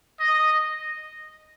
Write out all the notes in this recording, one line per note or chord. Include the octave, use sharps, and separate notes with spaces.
D#5